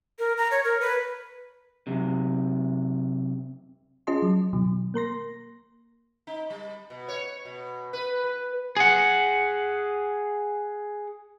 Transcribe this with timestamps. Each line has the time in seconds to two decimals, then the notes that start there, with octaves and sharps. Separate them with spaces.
0.19 A#4
0.38 A#5
0.51 C#5
0.64 A#4
0.80 B4
1.87 F#2 C3
4.07 C#4 F4 G#4 D#5 A5 C6
4.22 F#3
4.53 B2 D#3 F#3
4.94 A#3 A#4 C6 A#6
6.27 D#4
6.50 G3
6.90 B2
7.08 C#5
7.45 B2
7.93 B4
8.24 B4
8.77 G#4 F#5